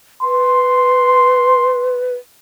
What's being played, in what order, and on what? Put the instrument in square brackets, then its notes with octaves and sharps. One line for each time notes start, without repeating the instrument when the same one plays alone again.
[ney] B4 [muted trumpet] C6